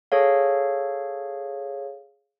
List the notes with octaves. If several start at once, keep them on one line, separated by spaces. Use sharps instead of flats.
G#4 A4 C#5 F5